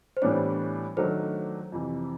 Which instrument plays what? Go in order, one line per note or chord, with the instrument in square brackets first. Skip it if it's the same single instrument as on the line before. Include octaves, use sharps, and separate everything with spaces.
[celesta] C5
[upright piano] A2 E3 G3 B3 D4 [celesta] C#5
[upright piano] D#3 F#3 A3 D4 [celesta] C5
[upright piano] F2 C3 E3